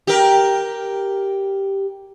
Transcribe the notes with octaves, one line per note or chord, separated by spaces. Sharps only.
G4 A#4